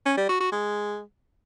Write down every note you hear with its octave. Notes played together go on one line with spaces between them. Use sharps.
C#4
G3
F#4
F#4
G#3